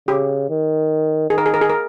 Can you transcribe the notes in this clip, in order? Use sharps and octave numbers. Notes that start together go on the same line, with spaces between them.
C#3 G4
D#3
D#3 G#4
A#4
G#4
A#4
G#4
A#4